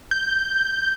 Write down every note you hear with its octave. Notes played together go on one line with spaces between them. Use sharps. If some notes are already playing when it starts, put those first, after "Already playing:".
G6